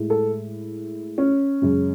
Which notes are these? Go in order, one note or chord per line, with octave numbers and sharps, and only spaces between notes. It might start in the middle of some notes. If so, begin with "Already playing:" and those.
Already playing: A2 G#3
A4
C#4
F#2 C#3 G#3